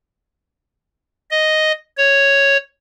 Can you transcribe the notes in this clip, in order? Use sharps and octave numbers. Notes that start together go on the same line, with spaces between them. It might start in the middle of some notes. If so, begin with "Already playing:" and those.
D#5
C#5